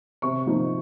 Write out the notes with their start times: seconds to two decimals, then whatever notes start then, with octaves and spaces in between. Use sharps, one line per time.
0.22 C3 C#6
0.46 F3 A#3 D#4